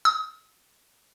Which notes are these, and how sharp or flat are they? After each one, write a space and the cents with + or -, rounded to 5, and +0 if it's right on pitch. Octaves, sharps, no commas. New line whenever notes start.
D#6 +30